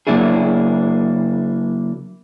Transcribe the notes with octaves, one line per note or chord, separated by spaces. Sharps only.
C#3 F#3 A#3 D4 E4 G#4